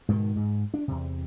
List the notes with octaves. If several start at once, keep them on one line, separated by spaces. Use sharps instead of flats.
G#2 B2 D3 D#3
G#2
D4
E2 C3